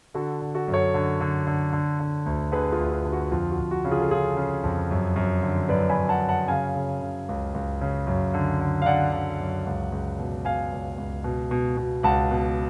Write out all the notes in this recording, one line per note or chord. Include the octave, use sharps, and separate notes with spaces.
D3 F#4 A4
D3
F#4 A4
F#2
A4 C#5
D3
D3
D3
D3
D3
D2
D3 G#4 B4
F4 G#4
D2
F4
D3
F#4
F2 F4
F#4
F2
F#4
C#3
F4 G#4
A4
C#3 F4 G#4
C#3
F2
F#2
F#2
D3
F#2 B4 D5
G#5 B5
F#2
F#5 A5
F#2
F#5 A5
C#3 F5 G#5
C#3
C#3
C#2
C#2
C#3
F#2
D3
D3
F5
D3 D5 F#5
D3
F#2
C#2
C#2
B2
B2 F5 G#5
C#2
C#2
B2
B2
B2
C#2 F#5 A5
B2